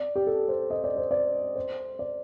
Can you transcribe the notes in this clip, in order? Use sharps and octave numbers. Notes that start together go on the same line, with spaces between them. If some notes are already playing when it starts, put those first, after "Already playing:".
Already playing: D5
G4
A4
C5
D#5
D5
C5
D5
C5
D5